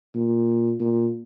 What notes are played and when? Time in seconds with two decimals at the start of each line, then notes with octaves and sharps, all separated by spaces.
0.15 A#2
0.80 A#2